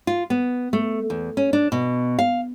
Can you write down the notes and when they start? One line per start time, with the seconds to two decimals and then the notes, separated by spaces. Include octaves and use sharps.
0.07 F4
0.30 B3
0.73 A3
1.10 E2
1.37 C#4
1.53 D4
1.72 B2
2.19 F5